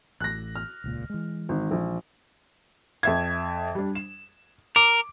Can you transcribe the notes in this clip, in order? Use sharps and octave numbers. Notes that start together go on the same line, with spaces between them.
A1 A2 F#6 A#6
F6
D#1 C#2 A#2
E3 G#3
G#1
A#1
F2 E5 G#6
G3 D4
E7
A#4 D6